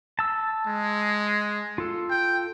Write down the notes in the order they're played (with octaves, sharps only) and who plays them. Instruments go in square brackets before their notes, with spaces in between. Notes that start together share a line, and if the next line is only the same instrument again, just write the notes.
[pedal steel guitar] A5 E6
[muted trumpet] G#3
[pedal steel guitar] F4 A4
[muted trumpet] G5